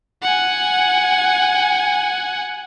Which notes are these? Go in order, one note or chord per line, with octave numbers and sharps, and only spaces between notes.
F#5 G#5